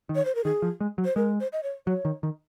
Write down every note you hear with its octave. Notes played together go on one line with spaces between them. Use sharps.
D#3
C#5
C5
A#4
D#3 G#4
F3
G#3
F#3
C5
G#3 A#4
C5
D#5
C#5
F#3 C#5
D#3
D#3